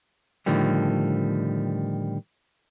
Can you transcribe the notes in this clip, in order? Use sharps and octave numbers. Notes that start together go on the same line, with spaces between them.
A2 D3 D#3 F3 G3